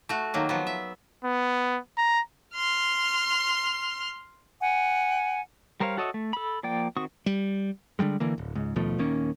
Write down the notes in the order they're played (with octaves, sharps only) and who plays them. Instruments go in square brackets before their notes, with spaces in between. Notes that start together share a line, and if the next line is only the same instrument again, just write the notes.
[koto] A3 F#4
D#3 F#3 A#3
F3 F#3 B3
E5
[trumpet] B3
A#5
[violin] C6 F6
[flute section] F#5 G#5
[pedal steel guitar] G3 A#4 C5 C#5 F5
F#4 A4 C#5 D#5 E5
A3
A4 B5
F3 A#3 D5 G5
D#3 C4 F#4 C#6 D#6
[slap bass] G3
[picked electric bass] D3 E3 G3 G#3
D3 E3 A#3
D1
C#2 G#2
D#2 B2 F3 A3
D#1 D#3 A#3 C#4